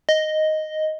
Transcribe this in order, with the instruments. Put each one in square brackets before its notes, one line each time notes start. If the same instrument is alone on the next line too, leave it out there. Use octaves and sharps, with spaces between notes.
[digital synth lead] D#5